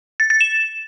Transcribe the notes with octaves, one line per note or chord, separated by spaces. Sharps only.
A6
A6
E7